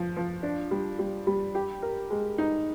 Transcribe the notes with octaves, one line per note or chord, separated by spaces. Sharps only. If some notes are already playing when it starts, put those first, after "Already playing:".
Already playing: F3
F3
D4
G3
G3
G3
G4
A#4
G#3
D#4